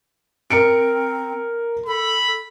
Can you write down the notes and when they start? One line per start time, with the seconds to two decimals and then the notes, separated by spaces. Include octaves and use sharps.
0.50 C4 A#4 C#7 D7
1.87 A4 B5